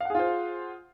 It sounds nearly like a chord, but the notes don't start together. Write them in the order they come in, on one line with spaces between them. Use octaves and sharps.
F5 F#5 G#4 F4 C5